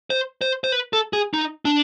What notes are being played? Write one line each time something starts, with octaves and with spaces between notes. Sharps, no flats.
C5
C5
C5
B4
A4
G#4
D#4
D4